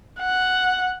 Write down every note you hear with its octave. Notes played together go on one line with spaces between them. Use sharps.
F#5